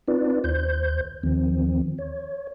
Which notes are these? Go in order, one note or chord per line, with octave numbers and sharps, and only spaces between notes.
C4 D#4 F4 B4 D5
D#2 C5 G6
D#2 D#3 F3 C4
C#5